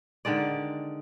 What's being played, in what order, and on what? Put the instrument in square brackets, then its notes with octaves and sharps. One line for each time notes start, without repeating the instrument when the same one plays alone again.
[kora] D3 D#3 G#3 D5